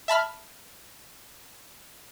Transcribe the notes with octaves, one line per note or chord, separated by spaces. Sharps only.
E5 A5 B5 F6